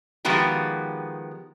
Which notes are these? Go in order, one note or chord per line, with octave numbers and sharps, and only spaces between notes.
D#3 F3 G#3 B3 F#4 G4